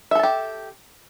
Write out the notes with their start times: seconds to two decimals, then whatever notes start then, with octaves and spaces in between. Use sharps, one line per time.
0.11 E5
0.15 A4
0.19 A5
0.23 G4